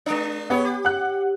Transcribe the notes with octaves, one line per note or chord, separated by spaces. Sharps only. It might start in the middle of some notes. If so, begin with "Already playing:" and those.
G#3 D4
B3 G4 G#4 C#5
G4
F#5 F#6